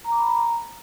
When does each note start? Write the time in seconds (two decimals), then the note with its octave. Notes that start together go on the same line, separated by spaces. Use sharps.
0.04 A#5
0.12 D6
0.19 B5
0.26 A#5